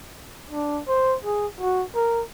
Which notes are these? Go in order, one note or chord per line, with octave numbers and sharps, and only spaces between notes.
D4
C5
G#4
F#4
A#4